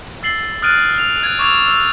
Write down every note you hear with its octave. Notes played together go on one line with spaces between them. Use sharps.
E6 A6 C7 F#7 G7
D#6 F6 F#6 A6 D7 D#7
F6 F7
F#6 G#6 D#7
C#6 D6 E6 G#6 F7
E6